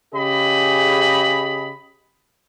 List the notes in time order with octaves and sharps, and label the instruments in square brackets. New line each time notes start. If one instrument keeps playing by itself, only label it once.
[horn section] C#3 G4 G#4 D#5 B5